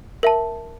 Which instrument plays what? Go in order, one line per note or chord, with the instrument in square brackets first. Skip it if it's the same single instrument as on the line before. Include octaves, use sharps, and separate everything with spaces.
[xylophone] A#4 E5 A5